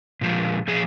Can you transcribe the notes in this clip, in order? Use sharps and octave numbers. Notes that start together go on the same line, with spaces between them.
A#2 F3 G#3
A#2 F3 G#4